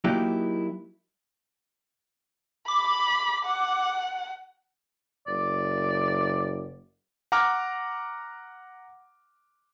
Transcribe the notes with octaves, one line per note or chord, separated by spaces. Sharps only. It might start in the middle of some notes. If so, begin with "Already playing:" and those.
F#3 A#3 D#4 E4 G4
B5 D6
F#5
F#1 D5
F#5 A#5 D6 F6